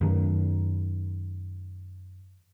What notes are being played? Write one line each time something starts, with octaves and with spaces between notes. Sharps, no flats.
F#2 D#3